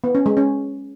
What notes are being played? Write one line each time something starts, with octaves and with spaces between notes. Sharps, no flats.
B3
C#4
G#3
C#4